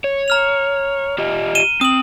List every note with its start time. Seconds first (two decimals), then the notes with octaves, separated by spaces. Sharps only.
0.04 C#5
0.28 A#5 F6 F7
1.18 F4 G4 D#5
1.55 D#7 E7 G7
1.81 C4 D#6 F#7